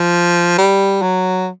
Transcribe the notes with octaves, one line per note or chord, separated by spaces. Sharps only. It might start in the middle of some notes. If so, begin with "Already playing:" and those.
Already playing: F3
G3
F#3